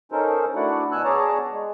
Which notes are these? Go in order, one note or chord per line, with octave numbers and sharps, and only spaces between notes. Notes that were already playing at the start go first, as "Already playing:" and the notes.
C#4 D#4 A4 A#4 C5
A3 D4 E4 F#4 D5 F#5
B2 G#5 E6 F#6
B3 G#4 C#5 D5 A5 A#5
G#3